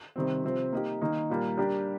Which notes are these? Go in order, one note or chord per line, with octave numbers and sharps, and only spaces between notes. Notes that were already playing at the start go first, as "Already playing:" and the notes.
C3 D#3 G3 C4
C3 F3 C4 G4
A#3 D#4 G4
D#3 A#3 D#4
A#2 G3 A#3
G3 D4 G4 A#4